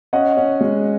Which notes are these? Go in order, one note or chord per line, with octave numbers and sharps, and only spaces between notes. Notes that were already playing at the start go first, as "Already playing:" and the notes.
C#4 D#5 F#5
C#4
G#3